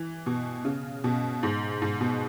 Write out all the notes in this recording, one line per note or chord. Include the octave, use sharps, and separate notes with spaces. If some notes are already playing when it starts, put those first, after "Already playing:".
Already playing: E3
B2
C#3
B2
G#2
G#2
B2